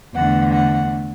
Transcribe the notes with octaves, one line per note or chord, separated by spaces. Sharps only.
E2 D3 A3 F#5
F#5